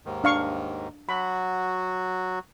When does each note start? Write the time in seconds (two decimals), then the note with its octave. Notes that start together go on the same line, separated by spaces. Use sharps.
0.06 D#2 G#2 D#3
0.24 D4 F5 C#6
1.09 F#3 F#4 B5